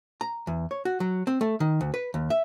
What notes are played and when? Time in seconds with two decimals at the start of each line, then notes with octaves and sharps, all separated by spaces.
0.21 A#5
0.47 E2
0.71 C#5
0.85 F#4
1.00 F#3
1.27 C4
1.41 A3
1.60 D#3
1.81 D2
1.94 B4
2.14 D#2
2.30 E5